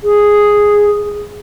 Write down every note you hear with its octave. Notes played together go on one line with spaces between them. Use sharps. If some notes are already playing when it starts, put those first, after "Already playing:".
G#4